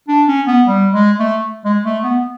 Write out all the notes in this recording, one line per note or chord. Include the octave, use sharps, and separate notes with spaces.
D4
C#4
B3
G3
G#3
A3
G#3
A3
B3